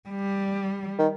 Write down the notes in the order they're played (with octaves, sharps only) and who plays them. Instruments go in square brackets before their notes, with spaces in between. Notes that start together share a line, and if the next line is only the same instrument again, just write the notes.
[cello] G3
[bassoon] D#3